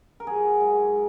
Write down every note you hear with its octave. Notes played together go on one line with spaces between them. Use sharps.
A#4
F#3 G#4
G#2